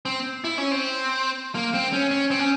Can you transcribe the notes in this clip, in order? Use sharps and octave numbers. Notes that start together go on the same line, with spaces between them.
C4
E4
C#4
C4
A#3
C4
C#4
C#4
C4
C#4